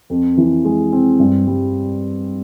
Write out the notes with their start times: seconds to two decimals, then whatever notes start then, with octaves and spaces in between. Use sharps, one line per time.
0.10 F2
0.37 E3
0.65 G#3
0.92 C4
1.20 G2
1.47 G3